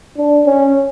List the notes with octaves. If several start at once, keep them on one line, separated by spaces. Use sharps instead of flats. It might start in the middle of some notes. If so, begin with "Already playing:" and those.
D4
C#4